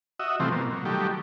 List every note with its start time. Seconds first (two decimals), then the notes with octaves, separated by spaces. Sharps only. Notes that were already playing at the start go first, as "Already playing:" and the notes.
0.20 F#4 D#5 E5
0.40 C3 E3 F3 G3 A3 C4
0.52 B2 A#3
0.71 F#3
0.85 D#3 F#3 G3 A3 G4